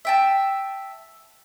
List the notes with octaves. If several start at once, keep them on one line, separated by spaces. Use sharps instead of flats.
E5 G5 A5